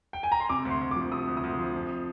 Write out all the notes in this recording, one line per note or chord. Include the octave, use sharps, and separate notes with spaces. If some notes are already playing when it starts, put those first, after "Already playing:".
G5
G#5
A#5
C6
C3 D6
D2
C6
D2
F3 D6
C3 D#6
D2
D#6
D2
F3
F2